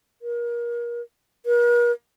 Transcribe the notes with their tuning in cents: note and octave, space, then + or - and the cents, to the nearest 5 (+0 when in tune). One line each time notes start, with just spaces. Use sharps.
A#4 +30
A#4 +45